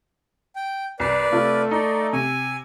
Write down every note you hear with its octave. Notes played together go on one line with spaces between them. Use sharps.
G5
C2 B4 D5 C7
C3 A3 F4
D#4 D5
C3 G#5